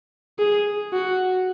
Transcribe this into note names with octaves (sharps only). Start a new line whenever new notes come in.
G#4
F#4